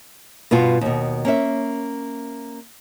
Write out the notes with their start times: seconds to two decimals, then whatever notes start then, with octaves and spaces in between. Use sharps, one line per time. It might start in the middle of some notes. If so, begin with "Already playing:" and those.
0.51 G2 B2 B3 F4
0.81 D#2 B2
1.25 A#3 C#4 E5